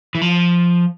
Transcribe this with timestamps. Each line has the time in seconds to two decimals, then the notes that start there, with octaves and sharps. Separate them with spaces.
0.15 E3
0.22 F3